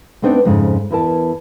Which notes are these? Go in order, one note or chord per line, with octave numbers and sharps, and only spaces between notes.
A3 B3 C4 D4 D#4
F2 G#2 C#3
E2 E4 A#4 A5